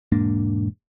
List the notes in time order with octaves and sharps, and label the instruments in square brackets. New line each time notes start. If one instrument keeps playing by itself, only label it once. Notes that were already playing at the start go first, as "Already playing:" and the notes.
[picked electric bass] E1 G#2 A#3 D4